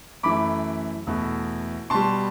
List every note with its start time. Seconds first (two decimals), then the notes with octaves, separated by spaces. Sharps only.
0.23 F#2 E3 A3 B5 D6
1.07 E2 B2 A3
1.90 B2 G3 A5 C6